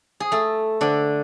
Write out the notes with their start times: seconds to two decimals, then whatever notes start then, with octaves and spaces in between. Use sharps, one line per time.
0.20 G#4
0.32 A3 A4
0.81 D3 D4